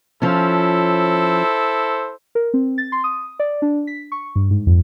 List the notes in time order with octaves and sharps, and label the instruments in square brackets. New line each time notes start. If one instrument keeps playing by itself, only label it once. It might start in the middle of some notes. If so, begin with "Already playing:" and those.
[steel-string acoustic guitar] F3 C#4 [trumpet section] E4 A4 C5
[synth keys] A#4
C4
A6
C6
D#6
D5
D4
B6
C#6
G2
G#2
F2